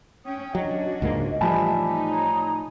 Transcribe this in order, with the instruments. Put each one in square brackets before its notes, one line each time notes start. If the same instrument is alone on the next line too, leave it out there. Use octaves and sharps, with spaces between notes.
[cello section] C#4 [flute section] G5 D#6
[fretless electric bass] F#3 [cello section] C#4 D4 F#4 [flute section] D#5
[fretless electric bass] C#2 G#2 A#3
[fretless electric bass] A2 F3 G3 [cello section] E3 E5 [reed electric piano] G#5 A5 B5
[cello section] D#4 [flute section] G4
[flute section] C#5 A#5 D#6